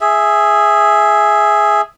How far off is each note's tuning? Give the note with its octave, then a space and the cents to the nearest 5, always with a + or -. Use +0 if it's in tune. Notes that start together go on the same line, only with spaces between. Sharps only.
G#4 +0 E5 +0